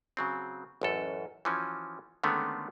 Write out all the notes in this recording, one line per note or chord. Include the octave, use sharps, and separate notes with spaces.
C#3 F#3 C4
A1 F#2 A4
E3 F3 C#4 F#4
D3 D#3 G#3 A3 B3 C#4